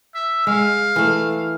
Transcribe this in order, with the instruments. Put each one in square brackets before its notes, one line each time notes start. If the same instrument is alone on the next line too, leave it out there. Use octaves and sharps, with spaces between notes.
[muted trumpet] E5
[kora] G#3 [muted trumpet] F5
[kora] E3 A3